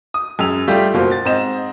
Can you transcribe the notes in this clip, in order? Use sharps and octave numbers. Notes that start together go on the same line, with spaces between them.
D#6
F#2 G#4 E6 F7
G3 A3 F4 G4
F#1 B2 A#3 F4 C5
A6
G#2 C4 D#5 E7